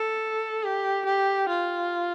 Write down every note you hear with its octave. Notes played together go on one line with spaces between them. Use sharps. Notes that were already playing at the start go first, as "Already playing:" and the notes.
Already playing: A4
G4
G4
F4